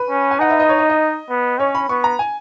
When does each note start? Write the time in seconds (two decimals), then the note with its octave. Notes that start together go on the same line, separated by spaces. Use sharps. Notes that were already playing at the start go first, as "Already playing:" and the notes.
Already playing: B4
0.09 C#4
0.31 G#5
0.39 D#4 F#5
0.50 E5
0.60 D#5
0.69 C#5
0.79 D#5
0.90 D#5
1.29 B3
1.59 C#4 C#5
1.75 B5
1.89 B3 C#6
2.04 A#5
2.19 G#5